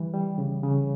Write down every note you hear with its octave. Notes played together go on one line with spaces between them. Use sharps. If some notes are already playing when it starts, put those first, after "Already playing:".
Already playing: E3 G3
G3
C#3
C#3